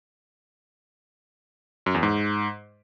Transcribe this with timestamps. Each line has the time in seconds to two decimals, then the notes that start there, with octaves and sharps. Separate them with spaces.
1.86 F#2
1.94 E2
2.03 G#2